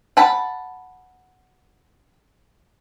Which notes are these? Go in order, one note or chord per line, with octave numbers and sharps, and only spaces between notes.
F#5 A5 B5